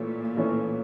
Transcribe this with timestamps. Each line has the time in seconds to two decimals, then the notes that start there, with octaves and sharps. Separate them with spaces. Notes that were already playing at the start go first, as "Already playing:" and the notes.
Already playing: A#2 E3 A3 C#4
0.37 E3 A3 C#4